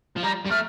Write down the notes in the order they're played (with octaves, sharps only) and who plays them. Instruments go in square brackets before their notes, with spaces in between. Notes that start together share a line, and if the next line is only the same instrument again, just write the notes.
[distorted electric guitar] F3
[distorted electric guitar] G3 [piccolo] A#5
[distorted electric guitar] G3
[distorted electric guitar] A3 [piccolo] F6